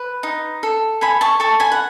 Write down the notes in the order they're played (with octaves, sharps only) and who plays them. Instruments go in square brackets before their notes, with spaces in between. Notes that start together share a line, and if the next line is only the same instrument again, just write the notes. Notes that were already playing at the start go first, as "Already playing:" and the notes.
Already playing: [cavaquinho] B4
D#4
A4
A4 G#5 B5
A5 C#6
A4 A5 C#6
G#5 B5
F#5